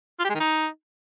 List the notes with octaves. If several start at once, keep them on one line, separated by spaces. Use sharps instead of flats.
F4
G4
G#3
D#3
D#4